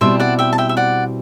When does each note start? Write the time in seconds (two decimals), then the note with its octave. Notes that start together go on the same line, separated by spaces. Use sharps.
0.01 B2 G3 C4 E4 C5 E5
0.20 D5 F#5
0.39 E5 G5
0.53 A5
0.58 E5 G5
0.69 E5
0.77 D5 F#5